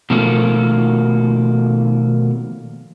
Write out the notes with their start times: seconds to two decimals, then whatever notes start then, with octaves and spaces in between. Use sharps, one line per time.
0.10 B2 D#3 F3 A3 A#3